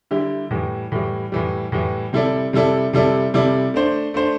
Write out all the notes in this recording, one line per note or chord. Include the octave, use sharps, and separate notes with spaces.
D3 G3 E4 G4
A2 E3 G3
A2 E3 G3
A2 E3 G3
A2 E3 G3
C3 G3 E4 A4 D5
C3 G3 E4 A4 D5
C3 G3 E4 A4 D5
C3 G3 E4 A4 D5
A3 D4 C5
A3 D4 C5